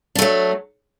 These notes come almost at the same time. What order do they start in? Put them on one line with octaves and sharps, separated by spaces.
D4 A3 F#3